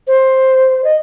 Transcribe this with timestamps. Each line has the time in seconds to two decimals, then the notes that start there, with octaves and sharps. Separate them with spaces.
0.07 C5
0.84 D#5